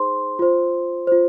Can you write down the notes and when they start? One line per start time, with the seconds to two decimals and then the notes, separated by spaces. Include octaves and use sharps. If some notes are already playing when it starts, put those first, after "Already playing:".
Already playing: D#4 G#4 C5 C6
0.39 F4 C5
1.07 F4 C5